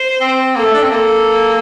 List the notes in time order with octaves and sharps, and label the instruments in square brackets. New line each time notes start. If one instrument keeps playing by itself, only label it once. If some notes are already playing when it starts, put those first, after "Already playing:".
Already playing: [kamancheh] C5
[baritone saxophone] C4
[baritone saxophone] A#3 [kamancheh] A4
[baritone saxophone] A3
D4
C4
[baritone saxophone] A#3 [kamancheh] A4